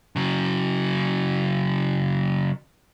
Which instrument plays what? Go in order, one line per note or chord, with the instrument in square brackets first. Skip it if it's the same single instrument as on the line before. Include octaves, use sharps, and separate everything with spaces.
[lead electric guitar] C#3 F#3